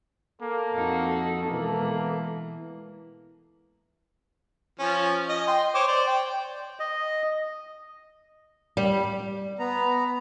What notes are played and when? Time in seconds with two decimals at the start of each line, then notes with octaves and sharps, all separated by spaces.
0.41 A#3 A4
0.73 F2 D#4 F#4
1.45 B2 E3 G#3 A#3
4.79 F3 C#4
5.29 D#5
5.47 G5 C6
5.75 C5 C#5 D6
5.88 C5 D5
6.07 G5
6.80 D#5
8.77 G3
9.59 B3 A#5